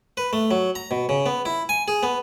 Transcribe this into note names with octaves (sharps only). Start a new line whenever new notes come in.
B4
A3
F#3
A#5
B2
C#3
B3
E4
G#5
G#4
B3